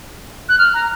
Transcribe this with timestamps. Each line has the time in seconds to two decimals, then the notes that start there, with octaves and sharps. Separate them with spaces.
0.49 F#6
0.59 F6
0.74 A#5